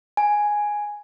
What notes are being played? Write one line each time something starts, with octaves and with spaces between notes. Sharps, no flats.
G#5